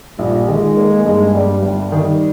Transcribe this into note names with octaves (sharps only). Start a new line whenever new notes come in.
A#1 G3
D#3 G#3
A#3
G2 G#3
G2 G3
G1 G3
D#3